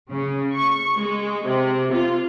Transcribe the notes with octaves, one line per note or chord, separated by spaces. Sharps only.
C#3
C#6
G#3
C3
F4